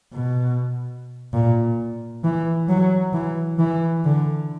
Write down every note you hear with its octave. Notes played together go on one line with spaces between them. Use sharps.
B2
A#2
E3
F#3
E3
E3
D3